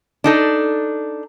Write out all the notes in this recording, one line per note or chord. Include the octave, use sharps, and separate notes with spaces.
D4 D#4 A4